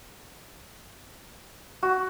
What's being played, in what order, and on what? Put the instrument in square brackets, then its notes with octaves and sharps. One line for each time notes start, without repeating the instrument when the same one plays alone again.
[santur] F#4